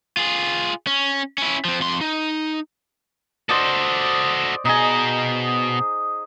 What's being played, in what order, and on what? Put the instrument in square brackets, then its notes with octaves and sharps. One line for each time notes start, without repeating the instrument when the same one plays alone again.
[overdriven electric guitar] F4 G#4
C#4
C#4 E4
F3 C4
F2 C6
D#4
[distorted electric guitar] F#4 A4 [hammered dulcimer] C5 D5 D#5
[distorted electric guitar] B2 D#5 [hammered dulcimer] D#4 G#4